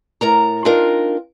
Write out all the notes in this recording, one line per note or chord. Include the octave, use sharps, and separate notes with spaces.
A2 A#4 A#5
C4 D4 D#4 F4 A#4